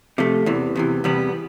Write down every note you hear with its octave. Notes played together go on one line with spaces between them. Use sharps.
C3 F3 A3
E2 C3 E3
E2 C3 E3
E2 C3 E3 G3 B3